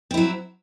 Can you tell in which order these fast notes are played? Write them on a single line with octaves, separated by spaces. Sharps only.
C4 E4 F#3